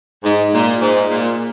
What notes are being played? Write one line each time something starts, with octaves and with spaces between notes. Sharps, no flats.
G#2
A#2
G#2
A#2